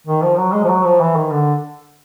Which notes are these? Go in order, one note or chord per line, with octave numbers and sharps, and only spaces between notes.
D#3
F3
F#3
G#3
F3
F#3
F3
E3
D#3
D3